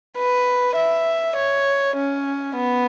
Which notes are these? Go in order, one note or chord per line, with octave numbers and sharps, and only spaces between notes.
B4
E5
C#5
C#4
B3